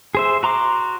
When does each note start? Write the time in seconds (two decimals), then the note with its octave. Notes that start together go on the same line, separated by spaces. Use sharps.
0.15 G#4 C5 E5
0.43 F#4 A#5 C6 D6